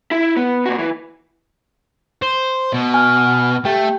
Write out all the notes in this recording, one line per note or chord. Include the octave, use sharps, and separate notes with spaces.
E4
B3
A#2 F#4
E3
C5
B2
G#5 F6
A3 G4 G5